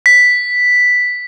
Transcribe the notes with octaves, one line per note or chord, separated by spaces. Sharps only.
B6